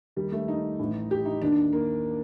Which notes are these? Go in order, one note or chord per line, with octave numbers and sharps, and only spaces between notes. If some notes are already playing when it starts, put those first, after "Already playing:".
D#2 D#3 G3
A3
D#4
A1 A2
G4
D#4
D#2 D#3 D4
D4
A#3